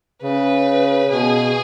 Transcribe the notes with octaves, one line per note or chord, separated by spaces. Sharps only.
C#3 B4
B2 G#4